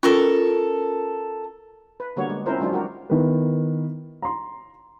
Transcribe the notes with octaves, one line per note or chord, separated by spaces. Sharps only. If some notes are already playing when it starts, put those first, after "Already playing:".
C#4 F4 A4 A#4 C#6
B4
D3 G3 A#3 B3 F#4 C#5
G#3
C4 C#4 E4 F4 A#4 C5
F3 F#3 G#3 D4 F4
G3 F#4 G4 A#4
D#3 B3 E4 A#4 B4
A#5 C6